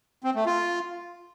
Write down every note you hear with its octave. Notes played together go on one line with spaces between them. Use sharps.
C4
A3
F4